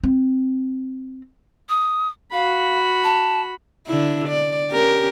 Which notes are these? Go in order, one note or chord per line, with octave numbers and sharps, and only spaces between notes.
C4
D#6
F#4 F5 B5
A5
D3 D4 E4
D5
C#4 G4 A#4